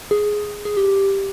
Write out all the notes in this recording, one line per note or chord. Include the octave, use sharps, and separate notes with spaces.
G#4
G#4
G4